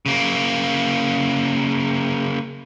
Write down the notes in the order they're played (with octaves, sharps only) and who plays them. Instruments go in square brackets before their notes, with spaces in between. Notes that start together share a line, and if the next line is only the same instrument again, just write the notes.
[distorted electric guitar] C#3 A#3